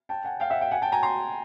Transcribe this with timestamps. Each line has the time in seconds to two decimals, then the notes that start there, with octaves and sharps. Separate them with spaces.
0.09 G5 A5
0.24 F#5 G#5
0.40 F5 G5
0.50 E5 F#5
0.60 F5 G5
0.71 F#5 G#5
0.82 G5 A5
0.92 G#5 A#5
1.03 A#5 C6